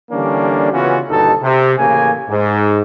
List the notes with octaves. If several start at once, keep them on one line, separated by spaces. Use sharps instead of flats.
D3 E3 G3 A#3 C#4 D4
C#3 E3 B3 C#4 F4 F#4
G1 D#2 B2 D#4 A4
C3
A1 C#3 A#3 G#5
G#2